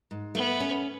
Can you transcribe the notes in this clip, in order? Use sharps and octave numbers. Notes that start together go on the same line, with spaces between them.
G#2
A3 B3
C#4